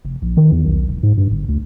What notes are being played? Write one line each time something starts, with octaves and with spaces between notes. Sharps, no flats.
F1
A#1
D#3
E2
B1
E1
G#2
G2
G1
D2